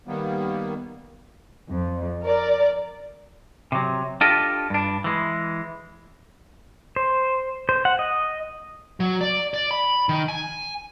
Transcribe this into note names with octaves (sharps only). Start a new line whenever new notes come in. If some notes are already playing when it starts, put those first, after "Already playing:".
D#3 G3 A#3 B3
F2
A#4 D5
C3 F#3
D4 F4 G4 A4 D#5
G2 D4
E3 G#3
C5
C5
F#5
D#5
F#3
D5
D5
B5
D#3
G#5